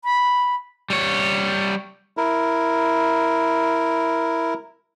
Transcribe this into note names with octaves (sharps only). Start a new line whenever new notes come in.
B5
G3 C#5
E4 A#4